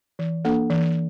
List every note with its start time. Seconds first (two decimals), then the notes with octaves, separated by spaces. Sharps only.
0.19 E3
0.45 A#3 D4 A4
0.70 E3